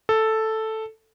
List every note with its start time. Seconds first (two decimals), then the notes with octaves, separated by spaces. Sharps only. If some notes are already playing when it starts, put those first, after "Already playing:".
0.09 A4